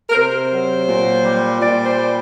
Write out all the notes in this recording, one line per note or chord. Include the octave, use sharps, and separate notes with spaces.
A#4
C3 C5
F#3
A#2
G3
A#2 D5
C5
G3